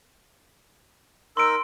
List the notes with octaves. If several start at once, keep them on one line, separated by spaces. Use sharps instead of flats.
D#4 A#4 C6 E6 D7